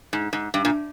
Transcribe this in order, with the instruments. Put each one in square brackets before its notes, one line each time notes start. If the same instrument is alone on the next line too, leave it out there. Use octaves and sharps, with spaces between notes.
[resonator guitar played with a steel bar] G#2
G#2
G2
A#2